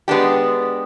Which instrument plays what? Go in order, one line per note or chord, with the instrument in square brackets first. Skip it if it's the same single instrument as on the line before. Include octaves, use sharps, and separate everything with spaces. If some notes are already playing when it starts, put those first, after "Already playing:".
[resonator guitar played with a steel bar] G#3 B3 D4 G4